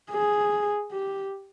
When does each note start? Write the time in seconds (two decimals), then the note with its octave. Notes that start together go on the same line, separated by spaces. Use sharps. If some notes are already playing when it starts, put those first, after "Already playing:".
0.11 G#4
0.91 G4